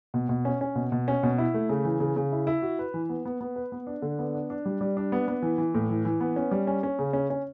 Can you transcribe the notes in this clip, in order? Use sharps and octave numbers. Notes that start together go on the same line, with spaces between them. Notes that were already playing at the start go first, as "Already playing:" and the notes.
B2
B2
C#4
C#4
B2
B2
C#4
B2
E4
A3
C#3
E3
C#3
C#3
E4
E4
F#4
B4
E3
B3
B3
B3
B4
B3
D4
D3
B3
D4
D4
G3
G3
D4
B3
B3
E3
E3
A2
E3
E3
B3
C#4
G3
C#4
C#4
C#3
C#4
C#4